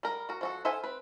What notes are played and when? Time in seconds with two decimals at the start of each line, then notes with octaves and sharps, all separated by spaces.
0.03 G3 A#4
0.29 F#4 A#4
0.41 F3 F#4 A4
0.65 A4 C5 E5 F5 G#5
0.84 C4 B4